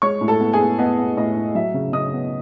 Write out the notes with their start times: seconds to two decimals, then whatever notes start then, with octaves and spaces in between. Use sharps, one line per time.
0.02 G#3 C#5 C#6
0.21 A2
0.28 A4 A5
0.40 B3
0.53 G#4 G#5
0.59 B3
0.79 B3 D#5
0.98 B3
1.17 A2 D#5
1.36 A2
1.55 F#3 E5
1.74 C#3
1.93 C#3 D#5 D#6
2.13 B3